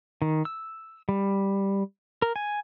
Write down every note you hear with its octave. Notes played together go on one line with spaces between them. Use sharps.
D#3
E6
G3
A#4
G#5